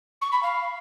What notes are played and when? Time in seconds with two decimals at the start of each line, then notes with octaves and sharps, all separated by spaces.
0.21 C#6
0.32 B5
0.42 F5